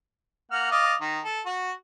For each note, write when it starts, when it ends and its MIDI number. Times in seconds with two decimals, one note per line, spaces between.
0.51 0.70 58
0.51 0.70 78
0.51 0.70 89
0.71 0.94 74
0.71 0.94 75
0.71 0.94 77
1.01 1.19 51
1.24 1.40 69
1.46 1.71 66